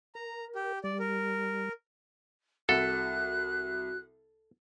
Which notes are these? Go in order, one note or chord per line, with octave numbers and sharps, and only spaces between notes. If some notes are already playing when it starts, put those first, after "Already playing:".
A#4 A#5
G4
G3 D5
A#4
C2 F#4 A4 F#6